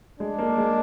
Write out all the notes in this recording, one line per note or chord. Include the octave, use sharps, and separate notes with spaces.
G#3 D4
A#3
G#3